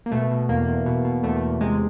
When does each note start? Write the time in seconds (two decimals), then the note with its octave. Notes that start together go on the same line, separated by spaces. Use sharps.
0.06 A#3
0.11 B2 A3
0.31 B2
0.49 E2 A#3
0.68 E2
0.86 B2
1.05 B2
1.23 E2 A3
1.42 E2
1.61 C3 G#3